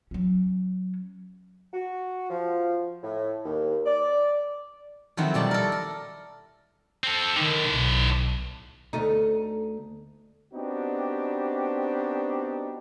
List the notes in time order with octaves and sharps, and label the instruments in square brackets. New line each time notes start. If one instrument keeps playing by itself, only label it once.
[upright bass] F#3 C#4
[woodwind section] F#4
F3
A2
D#2
D5
[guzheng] F2 D#3 F#3 B3 C4 E4
B2 G3 D5 A5
A4 A#4
A#4
[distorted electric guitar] C4 A4
[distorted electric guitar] A2 D3 [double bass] D#3
[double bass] B1
[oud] D2 A3 D#4
[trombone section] B3 C4 D4 D#4 F#4 G4